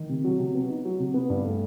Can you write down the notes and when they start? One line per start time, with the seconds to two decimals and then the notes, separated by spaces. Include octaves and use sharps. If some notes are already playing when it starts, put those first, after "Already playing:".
Already playing: D#3
0.09 C3
0.24 F#3
0.40 C3
0.55 B3
0.69 D#4
0.85 F#3
0.99 C3
1.14 B3
1.30 G2
1.44 A3